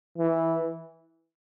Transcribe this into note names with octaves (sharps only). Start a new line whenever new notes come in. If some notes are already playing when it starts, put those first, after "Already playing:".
E3